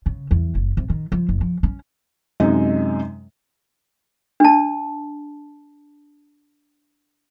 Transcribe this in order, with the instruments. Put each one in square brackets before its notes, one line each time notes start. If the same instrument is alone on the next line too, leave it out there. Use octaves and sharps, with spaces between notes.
[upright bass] C#3
E2
F#1
C3
D#3
F3
F#1
F3
C#4
[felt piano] F#2 C3 G#3 D#4
[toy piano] D4 A5